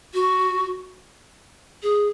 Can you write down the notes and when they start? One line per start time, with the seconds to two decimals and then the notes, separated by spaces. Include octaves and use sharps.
0.14 F#4
1.83 G#4